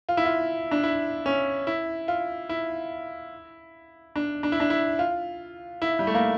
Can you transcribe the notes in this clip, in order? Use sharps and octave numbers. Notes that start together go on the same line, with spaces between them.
F4
E4
F4
D4
E4
C#4
E4
F4
E4
D4
D4
E4
D4
E4
F4
E4
G3
A3
A#3